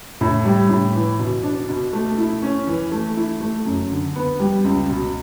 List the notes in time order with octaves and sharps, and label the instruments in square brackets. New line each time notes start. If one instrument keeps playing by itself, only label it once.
[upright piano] A2
G3
A2
E3
B2
D4
B2
A3
E4
C#4
E3
A3
E4
A3
F#2
D3
B3
G3
C#2
B2